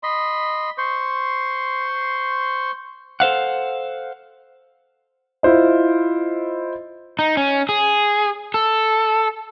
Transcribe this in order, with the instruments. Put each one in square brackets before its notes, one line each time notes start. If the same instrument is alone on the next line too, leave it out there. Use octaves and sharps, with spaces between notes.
[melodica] D#5 B5 C6
C5 C6 C#6
[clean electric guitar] A4 C5 F5 F#5
[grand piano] E4 F4 C5 D#5
[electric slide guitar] D#4
C#4
G#4
A4